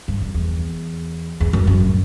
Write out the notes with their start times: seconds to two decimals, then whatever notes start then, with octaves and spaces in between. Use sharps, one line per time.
0.08 G2
0.21 F#2
0.34 E2
1.40 E2
1.53 F#2
1.67 F#2
1.80 A2